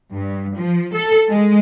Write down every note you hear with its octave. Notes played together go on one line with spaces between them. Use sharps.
G2
F3
A4
G#3